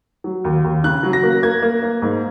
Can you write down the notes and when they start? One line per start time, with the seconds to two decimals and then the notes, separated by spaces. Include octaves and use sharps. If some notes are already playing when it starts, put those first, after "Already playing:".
0.24 F#3
0.45 D#2
0.64 D#2
0.84 C#3 F#6
1.03 F#3
1.13 A#6
1.23 A#3
1.43 A#3 G#6
1.62 A#3
1.83 A#3
2.02 G#2